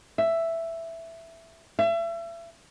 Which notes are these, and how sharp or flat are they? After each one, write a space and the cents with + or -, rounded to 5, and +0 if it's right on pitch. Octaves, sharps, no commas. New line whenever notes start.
E5 +5
E5 +35